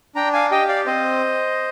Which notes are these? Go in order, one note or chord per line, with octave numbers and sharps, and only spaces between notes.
D4 G5 A#5
F5 G#5
G4 D#5 G5
D5 F5
C4 C5 D#5